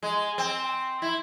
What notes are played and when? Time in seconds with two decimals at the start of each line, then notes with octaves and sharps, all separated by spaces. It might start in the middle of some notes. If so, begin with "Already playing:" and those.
0.03 G#3
0.38 C4
1.02 E4